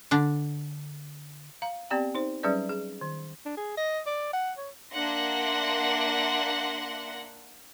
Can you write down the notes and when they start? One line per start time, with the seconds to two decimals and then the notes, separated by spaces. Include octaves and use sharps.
0.11 D3 D4
1.62 F5 A#5
1.90 B3 C4 G4 D5 G5 A#5
2.15 D#4 C5
2.43 F#3 G3 C#4 G#4 B4 D5
2.69 G#4
3.01 D#3
3.46 D4
3.57 G#4
3.78 D#5
4.07 D5
4.33 F#5
4.57 C#5
4.93 A#3 D4 E5 F#5 C6 A#6